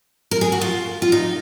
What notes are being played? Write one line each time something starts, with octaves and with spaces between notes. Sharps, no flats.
A#4
G#4
F#4
F4
F4
D#4